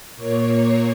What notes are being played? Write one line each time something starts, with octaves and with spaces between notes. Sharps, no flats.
A#2 A#3 C#5
A#4